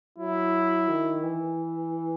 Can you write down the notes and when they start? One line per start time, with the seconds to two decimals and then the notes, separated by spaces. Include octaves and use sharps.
0.18 F#3 E4
0.88 D#3
1.23 E3